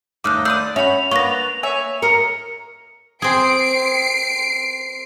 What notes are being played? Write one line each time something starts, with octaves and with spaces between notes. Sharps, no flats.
D#2 A3 D4 D#4 D#5 D6 F6 F#6
D5 C6 D#6 E6 G6
C#4 F#4 E5 B5 F7
A#3 B3 D4 B4 C#6 A#6
C#5 E5 G#5
A#4 D#5 C#7
C4 G#4 C7 D7